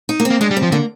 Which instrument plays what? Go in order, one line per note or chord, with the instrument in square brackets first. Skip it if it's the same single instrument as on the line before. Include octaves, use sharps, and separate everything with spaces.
[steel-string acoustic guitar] D#4
A#3
C4
[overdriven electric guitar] A#3
[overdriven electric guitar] G#3 [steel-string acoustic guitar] D4
[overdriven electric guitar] G3
[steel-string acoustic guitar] C4
[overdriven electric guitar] F3
[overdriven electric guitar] D3 [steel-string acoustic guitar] A#3